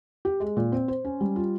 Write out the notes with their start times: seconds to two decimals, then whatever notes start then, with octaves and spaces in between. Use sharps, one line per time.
0.25 G4
0.40 G#3
0.57 A#2
0.72 C4
0.88 C5
1.05 C#4
1.21 G3
1.36 F4